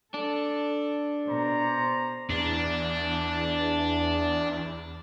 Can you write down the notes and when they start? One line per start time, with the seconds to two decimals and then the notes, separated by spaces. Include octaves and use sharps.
0.14 D4 A4
1.27 B2 C5 D5 A#5
2.30 E2 D4